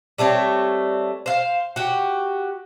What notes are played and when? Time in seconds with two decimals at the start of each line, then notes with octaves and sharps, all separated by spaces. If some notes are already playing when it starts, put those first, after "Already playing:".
0.18 G3 A3 C4 C#5
1.26 C5 F5
1.76 F#4 G4